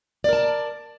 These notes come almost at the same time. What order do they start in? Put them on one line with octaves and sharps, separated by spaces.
D5 A#4 A5